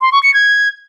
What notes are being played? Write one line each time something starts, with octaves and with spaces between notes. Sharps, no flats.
C6
C#6
C#7
G#6